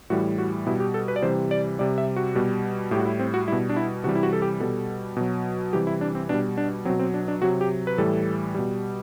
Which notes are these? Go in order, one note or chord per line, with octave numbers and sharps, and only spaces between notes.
A2 E3 G3 F#4
F#4
B2 G3 E4
G4
A4
B4
D5
C3 E3 G3 C5
D5
C3 G3 D5
E5
F#4
B2 G3
A2 G3 F#4 G4
E4
C4
F#4
B2 G3 E4
D4
E4
C3 E3 G3 F#4
E4
F#4
A4
G4
B2 G3 A4
B2 F#3
C3 E3 G3 G4
E4
D4
C4
B2 G3 D4
D4
B2 F#3 C4
C4
D4
D4
C3 F#3 F#4
G4
B4
A2 E3 G3 A4
B2 G3